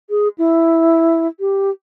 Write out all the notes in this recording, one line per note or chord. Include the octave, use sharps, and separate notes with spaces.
G#4
E4
G4